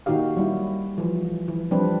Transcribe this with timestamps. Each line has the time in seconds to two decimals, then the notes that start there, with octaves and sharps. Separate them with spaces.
0.06 A#2 D#3 D#4 F#4 G4 F5
0.37 F#3 G3 E4
0.98 E3 F3
1.48 E3
1.71 F3 G3 C4 D4 B4